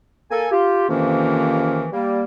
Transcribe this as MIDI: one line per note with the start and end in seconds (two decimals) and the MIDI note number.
0.31 0.47 58
0.31 0.47 69
0.31 0.47 80
0.51 0.84 65
0.51 0.84 67
0.88 1.86 41
0.88 1.86 48
0.88 1.86 51
0.88 1.86 52
0.88 1.86 58
0.88 1.86 61
1.92 2.23 55
1.92 2.23 58